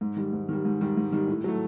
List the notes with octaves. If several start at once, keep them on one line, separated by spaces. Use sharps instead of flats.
G#2
D#3 G3
G#2
D#3 G3
G#2
D#3 G3
G#2
D#3 G3
A2
F#3 A3